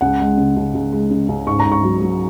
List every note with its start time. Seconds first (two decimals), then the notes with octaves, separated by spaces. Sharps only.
0.01 C#2 F#5
0.20 G#3
0.37 C#3
0.56 C#2
0.74 C#2
0.92 G#3
1.11 C#3
1.29 C#2
1.46 G#2 C#6
1.60 A#5
1.65 G#2
1.72 C#6
1.83 F#3
2.02 F#3